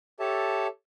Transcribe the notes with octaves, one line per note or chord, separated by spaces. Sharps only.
G4 A4 C#5 E5 A5